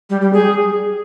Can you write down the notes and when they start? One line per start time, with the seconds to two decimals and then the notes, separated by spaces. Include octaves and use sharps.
0.10 G3
0.22 G3
0.33 G#4